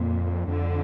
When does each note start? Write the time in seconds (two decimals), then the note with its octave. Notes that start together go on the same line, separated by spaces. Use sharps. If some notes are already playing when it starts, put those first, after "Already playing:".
Already playing: F2 A#2
0.48 F2 D3